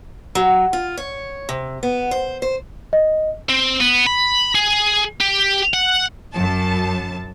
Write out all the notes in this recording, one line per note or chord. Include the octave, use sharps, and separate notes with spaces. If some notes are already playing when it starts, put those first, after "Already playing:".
F#3
F4
C#5
C3
B3
C5
C5
D#5
C4
B3
B5
G#4
G4
F#5
F#2 A5